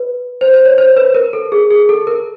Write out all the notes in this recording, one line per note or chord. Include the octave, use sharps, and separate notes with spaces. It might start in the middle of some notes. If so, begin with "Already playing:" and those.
Already playing: B4
C5
C5
C#5
C5
B4
A#4
A4
G#4
G#4
A4
A#4